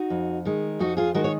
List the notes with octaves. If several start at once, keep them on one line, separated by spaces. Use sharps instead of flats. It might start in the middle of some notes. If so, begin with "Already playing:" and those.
Already playing: D#4 F#4
F2
D#3 G#3
F2 D#4 F#4
F4 G#4
D#3 G#3 F#4 A#4
C#5